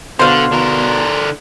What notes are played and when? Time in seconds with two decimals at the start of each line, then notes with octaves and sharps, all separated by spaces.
0.19 B2 D3 C5 F5 C6
0.52 B2 D3 A#4